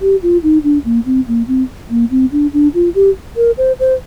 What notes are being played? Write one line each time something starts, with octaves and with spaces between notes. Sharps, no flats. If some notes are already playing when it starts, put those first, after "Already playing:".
G4
F4
D#4
D4
A#3
C4
A#3
C4
A#3
C4
D4
D4
F4
G4
A#4
C5
C5